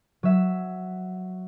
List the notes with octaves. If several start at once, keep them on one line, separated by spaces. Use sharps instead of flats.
F#3 E5